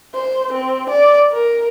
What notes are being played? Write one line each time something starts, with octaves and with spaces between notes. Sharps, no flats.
C5
C4
D5
A#4